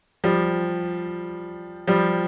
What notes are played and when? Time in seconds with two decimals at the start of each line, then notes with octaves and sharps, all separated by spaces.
0.24 F3 G3
1.88 F3 G3